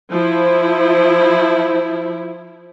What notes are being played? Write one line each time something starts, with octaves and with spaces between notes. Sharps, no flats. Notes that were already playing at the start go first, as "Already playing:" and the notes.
F3 E4